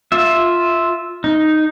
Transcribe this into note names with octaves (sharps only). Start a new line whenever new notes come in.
F4 E5
D#4